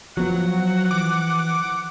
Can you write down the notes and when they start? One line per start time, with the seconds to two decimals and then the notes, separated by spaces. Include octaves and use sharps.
0.17 F3 F#3 B3 F#5
0.91 E3 D6